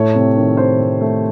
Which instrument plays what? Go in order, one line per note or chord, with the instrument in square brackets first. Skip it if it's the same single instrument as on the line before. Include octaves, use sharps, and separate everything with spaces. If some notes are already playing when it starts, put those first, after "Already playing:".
Already playing: [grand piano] A2 A3 C#5
C3
D#3
D#3 C5
C3
A3